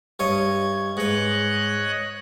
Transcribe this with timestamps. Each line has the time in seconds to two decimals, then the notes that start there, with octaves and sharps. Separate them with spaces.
0.19 G2 C#5 D#5 G#6
0.97 G#2 B4 C#5 D#5 F#6